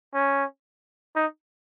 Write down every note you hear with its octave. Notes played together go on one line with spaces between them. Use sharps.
C#4
D#4